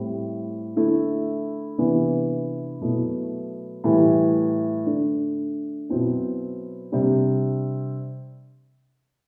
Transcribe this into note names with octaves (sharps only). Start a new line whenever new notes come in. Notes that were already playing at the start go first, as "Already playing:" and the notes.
Already playing: A2 G3 C4 E4
D3 A3 E4
C3 E3 B3 D4
B2 F#3 A3 E4
A2 E3 G3
D3 A3 D4
B2 F#3 C4 E4
C3 G3 D4